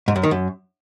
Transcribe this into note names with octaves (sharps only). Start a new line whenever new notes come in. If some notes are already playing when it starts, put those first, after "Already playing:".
G#2
F#2
D#3
F#2